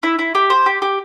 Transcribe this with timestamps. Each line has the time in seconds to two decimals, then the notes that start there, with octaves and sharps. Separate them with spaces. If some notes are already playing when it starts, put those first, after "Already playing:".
0.03 E4
0.19 E4
0.35 G4
0.50 C5
0.66 G4
0.82 G4